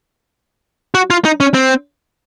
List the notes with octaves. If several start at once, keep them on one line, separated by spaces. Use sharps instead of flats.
F#4
F4
D#4
C#4
C4